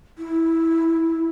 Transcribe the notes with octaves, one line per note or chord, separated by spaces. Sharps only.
E4